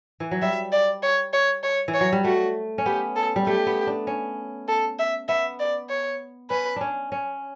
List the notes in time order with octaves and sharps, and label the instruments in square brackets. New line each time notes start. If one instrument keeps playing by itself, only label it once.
[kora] E3
F#3
[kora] G3 [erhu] E5
[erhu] D5
C#5
C#5
C#5
[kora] E3
[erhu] C#5
[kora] F#3
G3
[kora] A3 [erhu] F#4
[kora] C#4
[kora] B3 [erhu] G4
[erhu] A4
[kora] G3
[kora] A3 [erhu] G4
[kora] B3
D4
C#4
[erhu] A4
E5
[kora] B3 [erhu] E5
[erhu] D5
C#5
[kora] C#4 [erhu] B4
[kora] C#4 D4
C#4